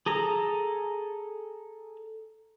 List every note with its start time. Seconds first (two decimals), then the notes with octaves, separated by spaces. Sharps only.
0.06 G#4 A4 A#5